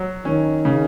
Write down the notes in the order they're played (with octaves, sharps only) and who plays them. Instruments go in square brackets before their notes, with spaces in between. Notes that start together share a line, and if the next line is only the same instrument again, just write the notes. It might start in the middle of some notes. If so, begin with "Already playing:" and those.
Already playing: [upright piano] F#3
[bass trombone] D#3 [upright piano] C#4
[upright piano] C#3